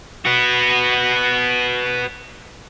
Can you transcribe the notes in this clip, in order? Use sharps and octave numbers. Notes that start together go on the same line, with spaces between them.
B3 F#4